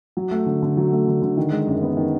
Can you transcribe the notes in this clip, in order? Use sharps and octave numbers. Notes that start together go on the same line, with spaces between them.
F#3
A3
D3
D3
F#3
A3
D3
D3
D#3
G#3
F#2
B3
D#3